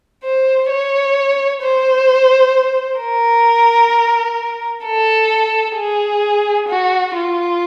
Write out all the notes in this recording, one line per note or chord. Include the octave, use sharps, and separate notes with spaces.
C5
C#5
C5
A#4
A4
G#4
F#4
F4